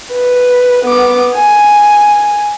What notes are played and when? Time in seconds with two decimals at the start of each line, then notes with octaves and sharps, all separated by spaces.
0.13 B4
0.86 B3 D6
1.34 G#5